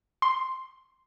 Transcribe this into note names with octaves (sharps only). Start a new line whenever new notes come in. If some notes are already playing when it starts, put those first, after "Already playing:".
C6